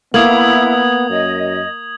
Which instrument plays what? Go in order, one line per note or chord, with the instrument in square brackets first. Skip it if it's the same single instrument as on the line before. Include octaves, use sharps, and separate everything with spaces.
[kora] A#3 [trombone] B3 [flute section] E4 [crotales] D#6 G#6 F#7
[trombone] F#2 [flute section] D#5